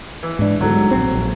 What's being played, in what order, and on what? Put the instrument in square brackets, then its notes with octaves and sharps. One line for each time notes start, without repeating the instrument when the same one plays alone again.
[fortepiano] E3
[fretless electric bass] G#2 D4
[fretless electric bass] G1 G#2 [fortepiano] F#3 A4
[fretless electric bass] A#1 C4
A#1